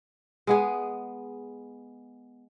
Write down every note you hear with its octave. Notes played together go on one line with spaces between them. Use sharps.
G#3 B3 G#4